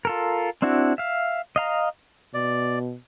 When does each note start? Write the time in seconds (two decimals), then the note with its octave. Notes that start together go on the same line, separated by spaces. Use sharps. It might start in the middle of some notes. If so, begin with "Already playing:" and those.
0.05 F4 A4 A#4
0.62 C4 D4 E4 F#4
0.98 E5 F5
1.56 D#5 F5 A#5
2.34 B2 D5